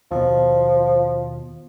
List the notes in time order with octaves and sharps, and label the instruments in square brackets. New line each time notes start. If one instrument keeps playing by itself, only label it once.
[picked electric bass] D#2 B2 [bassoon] F3